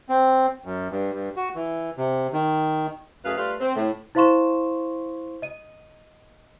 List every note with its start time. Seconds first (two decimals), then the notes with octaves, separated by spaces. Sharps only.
0.09 C4
0.65 F#2
0.91 G2
1.13 G2
1.36 F#4
1.55 E3
1.97 C3
2.33 D#3
3.25 F#2 A3 G#4 B4 F5
3.37 G3 A3 F4 B4 F5
3.60 C4
3.76 A2
4.15 E4 C5 F5 C6 C#6 E7
5.42 D#5 D#7